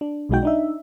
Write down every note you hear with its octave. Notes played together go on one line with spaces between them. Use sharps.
D4
B1 B2 G#3 D#4 F#4 G5
D4 D#4 E5